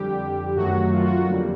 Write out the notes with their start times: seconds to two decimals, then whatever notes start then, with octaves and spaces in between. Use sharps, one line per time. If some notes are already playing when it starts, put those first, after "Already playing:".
Already playing: F2 D3 G3 G4
0.56 F#2 D#3 F#3 A3 F#4
0.92 F4
1.04 F#4
1.28 F2 D3 G3 A#3